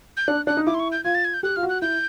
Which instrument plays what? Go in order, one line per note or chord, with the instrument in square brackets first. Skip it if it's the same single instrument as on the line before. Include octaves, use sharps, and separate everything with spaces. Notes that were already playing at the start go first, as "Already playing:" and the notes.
[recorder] G6
[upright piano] D4 [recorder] F#6
[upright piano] D4 [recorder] F#6
[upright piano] D#4
[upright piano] E4 [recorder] D6
[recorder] C6
C#6
G6
[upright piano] F4 [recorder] G#6
[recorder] A6
G#6
G6
[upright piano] G4 [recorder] F#6
[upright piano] F4 [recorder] F6
[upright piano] F#4
[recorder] F#6
[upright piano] E4 [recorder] G6